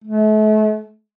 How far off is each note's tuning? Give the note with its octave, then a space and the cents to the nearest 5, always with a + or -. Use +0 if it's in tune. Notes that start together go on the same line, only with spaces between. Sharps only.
A3 -40